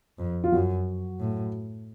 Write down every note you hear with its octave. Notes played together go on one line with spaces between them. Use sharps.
F2
F4
F#2 F#3 F#4
A2